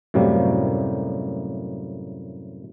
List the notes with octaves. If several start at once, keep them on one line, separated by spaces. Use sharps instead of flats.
F#2 A2 C3 G3 A#3